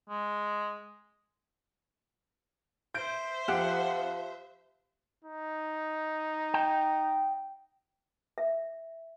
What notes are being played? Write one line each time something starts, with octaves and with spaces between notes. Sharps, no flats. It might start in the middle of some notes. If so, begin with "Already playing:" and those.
G#3
C5 E5 G6 D7
F2 F3 G4 F#5 F#6
D#4
G5
E5